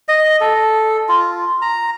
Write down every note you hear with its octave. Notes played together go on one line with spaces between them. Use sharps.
D#5
A4
F4
A#5